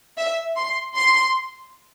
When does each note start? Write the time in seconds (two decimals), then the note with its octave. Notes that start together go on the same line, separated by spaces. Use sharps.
0.17 E5
0.56 C6
0.96 C6